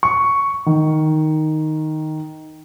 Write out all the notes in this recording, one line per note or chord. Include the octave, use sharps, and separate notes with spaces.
C#6
D#3